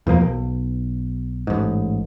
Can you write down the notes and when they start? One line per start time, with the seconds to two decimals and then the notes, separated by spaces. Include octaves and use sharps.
0.07 E2 B2 F3 A#3
0.21 B1
1.47 A1 G#2